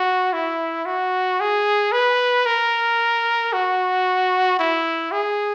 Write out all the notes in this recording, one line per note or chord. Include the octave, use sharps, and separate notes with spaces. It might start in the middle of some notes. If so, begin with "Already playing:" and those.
Already playing: F#4
E4
F#4
G#4
B4
A#4
F#4
E4
G#4